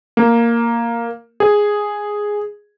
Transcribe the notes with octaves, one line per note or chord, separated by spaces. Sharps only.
A#3
G#4